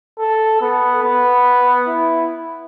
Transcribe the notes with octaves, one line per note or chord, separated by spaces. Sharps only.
A4
B3
B3
E4